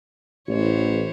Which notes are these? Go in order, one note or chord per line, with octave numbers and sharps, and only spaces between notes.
A1 E3 C5 C#5